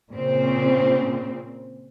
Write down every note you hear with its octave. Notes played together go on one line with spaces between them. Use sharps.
A#2 C#3 C4